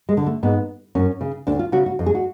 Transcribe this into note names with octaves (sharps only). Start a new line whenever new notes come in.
G#3
D3
A3
G#2 B3
F#2 C#4
C#3
D2 D4
F4
C#3 F#4
F#4
F2
G#4
F#4